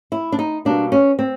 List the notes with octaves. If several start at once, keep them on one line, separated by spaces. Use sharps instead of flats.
E4
D4
D#4
B2 G3 A#3 D4
C#4
C4